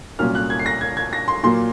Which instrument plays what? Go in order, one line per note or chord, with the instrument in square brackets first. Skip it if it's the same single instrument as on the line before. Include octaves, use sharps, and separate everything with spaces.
[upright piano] C2 A#2 F#3 C#4 F6
F#6
G#6
C7
A#6
G#6
G#6
A#6
C6
A#2 F#3 A#3 C6